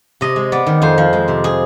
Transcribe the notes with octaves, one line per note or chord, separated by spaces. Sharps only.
C3 D#5
G#3
B3 D5
D#3
F2 C5
F3
G#3
C3
G#4